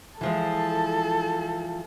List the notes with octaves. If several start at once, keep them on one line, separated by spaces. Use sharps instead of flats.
E3 F3 G#3 A4